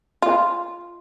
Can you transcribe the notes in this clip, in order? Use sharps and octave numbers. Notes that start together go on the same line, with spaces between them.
F4